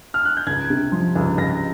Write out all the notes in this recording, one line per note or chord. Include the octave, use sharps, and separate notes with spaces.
F6
F#6
G6
C#2 G#6
C3
F3
C#2
C#2 A#6